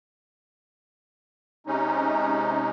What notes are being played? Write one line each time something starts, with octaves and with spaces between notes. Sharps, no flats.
C3 G#3 C#4 D#4